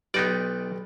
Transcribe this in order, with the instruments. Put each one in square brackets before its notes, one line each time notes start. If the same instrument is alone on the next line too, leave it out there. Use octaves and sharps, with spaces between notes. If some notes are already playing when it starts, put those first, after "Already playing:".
[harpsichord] B1 G5 [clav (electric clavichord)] B3 D#4 D5 [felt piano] G4